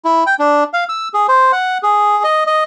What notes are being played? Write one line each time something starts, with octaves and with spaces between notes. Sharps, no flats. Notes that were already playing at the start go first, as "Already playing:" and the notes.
E4
G5
D4
F5
E6
G#4
C5
F#5
G#4
D#5
D#5